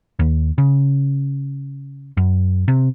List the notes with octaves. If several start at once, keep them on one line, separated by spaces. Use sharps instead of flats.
D#2
C#3
F#2
C3